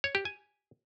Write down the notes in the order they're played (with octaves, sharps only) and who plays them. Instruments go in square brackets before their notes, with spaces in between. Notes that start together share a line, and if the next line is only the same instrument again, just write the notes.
[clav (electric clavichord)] C#5
G4
G#5